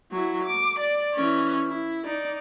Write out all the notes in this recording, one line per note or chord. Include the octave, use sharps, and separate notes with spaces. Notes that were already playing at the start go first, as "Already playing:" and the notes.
F#3 E4
D6
D5
E3 C#4
E4
D#4 D5